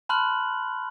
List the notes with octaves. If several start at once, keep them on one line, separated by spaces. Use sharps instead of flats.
A5 B5 C6 F6 F#6 F#7